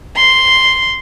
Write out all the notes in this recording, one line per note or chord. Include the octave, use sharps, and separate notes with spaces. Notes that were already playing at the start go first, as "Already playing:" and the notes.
C6